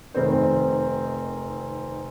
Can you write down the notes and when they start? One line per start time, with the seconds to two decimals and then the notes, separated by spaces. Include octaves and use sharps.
0.14 F1 D#3 C4 C5